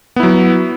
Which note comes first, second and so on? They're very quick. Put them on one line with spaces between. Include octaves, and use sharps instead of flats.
B3 E4 F#3